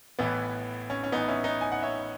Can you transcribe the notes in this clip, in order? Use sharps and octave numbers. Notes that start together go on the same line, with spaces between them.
A1 A2 E3 B3
C#4
C#4
A1 A2 E3 B3 D#4
C#4 E4
B3 D#4
G#5
F#5
C#5 E5